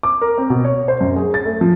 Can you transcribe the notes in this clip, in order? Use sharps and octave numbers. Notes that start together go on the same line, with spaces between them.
D6
A#4
C4
B2
C#5
C5
F#2
G#4
A6
A3
F3